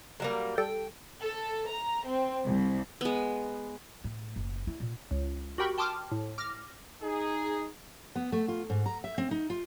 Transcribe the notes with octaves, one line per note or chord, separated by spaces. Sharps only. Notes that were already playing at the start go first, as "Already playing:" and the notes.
F#3 G3 A#3
G3 A4 G5
A4
A#5
C4
C2
G#3 B3
A2
F#1
E4
A#2
C#2
F#4 G4 A#4 G5 B5 C#6
G5 A5 C6 D6 D#6 F6
A2
D6 F6 A#6
D#4 G#4
B3
A3
F4
G#2
A#5
E5
C4
D#4
F4